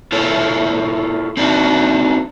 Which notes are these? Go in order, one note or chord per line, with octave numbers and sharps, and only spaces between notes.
E4 F4 A4 A#4 C#5
C4 D4 D#4 F4 F#4